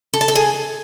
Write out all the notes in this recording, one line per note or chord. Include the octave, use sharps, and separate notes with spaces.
A4
A5
A4
G#4